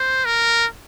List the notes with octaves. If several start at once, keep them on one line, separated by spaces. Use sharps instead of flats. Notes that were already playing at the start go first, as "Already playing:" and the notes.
Already playing: C5
A#4